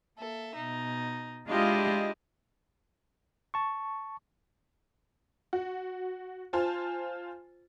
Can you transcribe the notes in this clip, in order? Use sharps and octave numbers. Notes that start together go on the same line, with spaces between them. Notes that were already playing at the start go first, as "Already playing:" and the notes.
A#3 A4 E5
B2 D#4
G#3 D4 E4 F4 G4 D#5
A5 C#6
F#4
F4 C5 G#5 A5